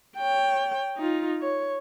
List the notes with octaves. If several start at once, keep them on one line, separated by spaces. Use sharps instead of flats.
C#5 G5
D#4 F4
C#5